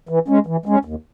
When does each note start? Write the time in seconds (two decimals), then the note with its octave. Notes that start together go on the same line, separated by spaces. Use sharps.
0.09 E3
0.28 G#3 C#4
0.47 E3
0.66 G#3 C#4
0.85 D#2